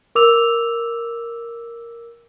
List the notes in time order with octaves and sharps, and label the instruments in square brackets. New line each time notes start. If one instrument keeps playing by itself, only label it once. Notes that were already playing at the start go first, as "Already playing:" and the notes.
[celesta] A#4 D6 E6 F7